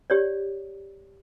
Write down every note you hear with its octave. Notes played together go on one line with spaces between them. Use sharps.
G4 C#5 D5